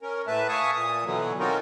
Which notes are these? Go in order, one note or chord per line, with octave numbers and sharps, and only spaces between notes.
C#4 A#4
A2 A3 B4 E5 A5
E5 F5 G#5 A5 C#6 D#6
A#2 D#6
B2 D3 E3 F#3
C4 C#4 D#4 F4 F#4 A#4